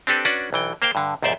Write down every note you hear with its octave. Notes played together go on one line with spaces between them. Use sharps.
C4 D4 G4 A4 B4
C#4 D4 F#4 B4 D5
B1 E3 G5
A#3 C5 F5 G5
G2 D3
B1 E2 G#2 C5 D5 E5